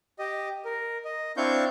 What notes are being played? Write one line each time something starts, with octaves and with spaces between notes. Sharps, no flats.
G4 D#5
A#4
D#5
C4 D4 E4 F5 C#6 G6